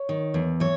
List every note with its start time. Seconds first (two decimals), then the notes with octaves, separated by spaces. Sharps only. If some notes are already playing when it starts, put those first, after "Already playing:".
Already playing: C#5
0.09 D#3
0.34 E2
0.60 E3 C#5